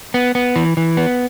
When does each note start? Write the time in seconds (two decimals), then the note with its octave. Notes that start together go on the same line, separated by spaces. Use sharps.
0.14 B3
0.35 B3
0.56 E3
0.77 E3
0.97 B3